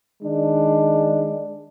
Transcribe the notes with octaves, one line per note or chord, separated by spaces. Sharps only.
D#3 G#3 D4